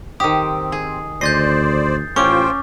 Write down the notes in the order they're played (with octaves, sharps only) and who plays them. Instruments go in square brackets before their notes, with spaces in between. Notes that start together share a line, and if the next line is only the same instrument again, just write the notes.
[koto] D#3 G4 [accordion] C4 [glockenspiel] D#6
[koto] G#4
[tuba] D2 [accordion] C5 D5 [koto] D#5 [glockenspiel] G6 A6 C7
[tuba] A1 [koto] C#4 [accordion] F4 C5 G5 [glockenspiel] C#6 D6